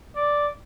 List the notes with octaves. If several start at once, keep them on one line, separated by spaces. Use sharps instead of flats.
D5